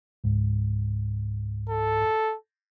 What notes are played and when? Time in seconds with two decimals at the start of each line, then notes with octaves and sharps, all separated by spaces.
0.24 C#2 G#2
1.69 A4